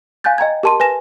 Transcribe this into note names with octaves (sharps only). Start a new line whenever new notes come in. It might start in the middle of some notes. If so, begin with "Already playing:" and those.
F5 G#5 F#6 G6 A6
D#5 G5 A#5 G#6
G4 A#4 A5 C6 D#7
B4 G#5 A#6 E7